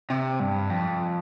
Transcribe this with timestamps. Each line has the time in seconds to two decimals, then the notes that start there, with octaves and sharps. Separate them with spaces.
0.10 C3
0.40 G2
0.70 F2